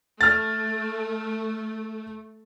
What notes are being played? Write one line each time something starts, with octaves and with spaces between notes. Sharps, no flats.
A3 F6 A6